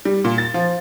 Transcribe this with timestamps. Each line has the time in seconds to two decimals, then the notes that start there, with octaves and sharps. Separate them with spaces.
0.05 G3
0.24 A#2
0.38 A6
0.54 F3